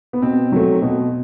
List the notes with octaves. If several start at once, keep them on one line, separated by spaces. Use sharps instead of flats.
B3
B2 C4
F#3 A3
B2